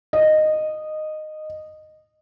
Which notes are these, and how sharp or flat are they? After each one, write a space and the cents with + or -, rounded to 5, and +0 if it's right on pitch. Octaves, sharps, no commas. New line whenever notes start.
D#5 -10